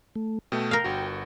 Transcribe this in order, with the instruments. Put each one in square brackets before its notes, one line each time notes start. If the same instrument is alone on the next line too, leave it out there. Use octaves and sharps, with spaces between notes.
[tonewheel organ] A3
[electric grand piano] B2 A3 [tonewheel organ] G5
[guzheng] A#4 F5
[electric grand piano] G1 F#4